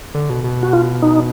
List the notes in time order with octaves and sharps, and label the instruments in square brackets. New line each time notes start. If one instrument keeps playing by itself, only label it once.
[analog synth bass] D3
B2
B2
[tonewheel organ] F#4
F4
D#4